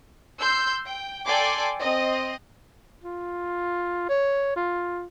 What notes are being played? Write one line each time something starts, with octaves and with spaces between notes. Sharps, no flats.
C6 E6 G6
G5
A4 D5 G5 G#5 C6 D6
C4 D#5
F4
C#5
F4